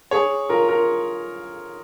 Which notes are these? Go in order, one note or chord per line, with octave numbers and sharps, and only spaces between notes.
G#4 C#5
F4 A#4
F4 A#4